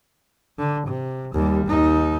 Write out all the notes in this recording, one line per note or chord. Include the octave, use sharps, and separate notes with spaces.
D3
C3
D#2 G3
D#2 D#4